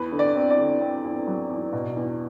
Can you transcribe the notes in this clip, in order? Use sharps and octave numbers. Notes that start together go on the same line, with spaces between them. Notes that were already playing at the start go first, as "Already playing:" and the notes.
Already playing: E2 B4
D3
D5
C4
D5
D3
C4
E2
F#3
E2
B2
E2